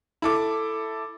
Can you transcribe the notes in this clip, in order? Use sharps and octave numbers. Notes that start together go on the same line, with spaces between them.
E4 A4 D6